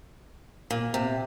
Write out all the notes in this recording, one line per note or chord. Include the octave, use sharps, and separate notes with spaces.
A#2
C3